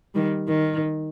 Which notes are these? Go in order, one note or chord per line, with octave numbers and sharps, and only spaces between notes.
D#3 G3
D#3